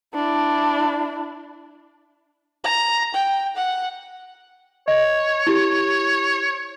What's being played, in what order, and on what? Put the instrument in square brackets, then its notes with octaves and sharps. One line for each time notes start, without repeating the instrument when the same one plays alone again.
[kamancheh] D4 E4
A#5
G5
F#5
[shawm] C#5 [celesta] D#5
[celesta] E4 G4